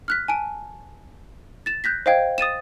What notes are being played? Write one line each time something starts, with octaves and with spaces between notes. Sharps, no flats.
F6 F#6 B6
G#5 A5 D7
A6 E7
F#6 G6 A#6 B6
C5 D#5 F5 G5 G#6
D#6 A6 D#7 E7